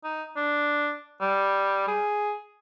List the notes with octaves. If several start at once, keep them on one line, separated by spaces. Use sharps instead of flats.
D#4
D4
G3
G#4